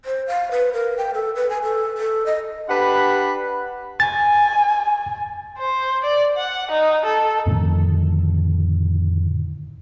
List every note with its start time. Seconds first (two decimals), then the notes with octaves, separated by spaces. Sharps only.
0.05 C5
0.28 F5
0.51 B4
0.73 A#4
0.98 G5
1.14 A4
1.36 B4
1.50 G#5
1.63 A4
1.97 A4
2.26 D#5
2.69 D4 G4 B4 F#5 B5
4.00 G#5 A6
5.58 C5
6.04 D5
6.36 F#5
6.71 D#4
7.06 A4
7.46 F2 A2 D3 D#3